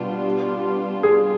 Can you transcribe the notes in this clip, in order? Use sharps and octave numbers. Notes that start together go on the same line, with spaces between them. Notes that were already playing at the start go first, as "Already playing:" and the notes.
Already playing: B2 G3 B3 D4 F4
G#4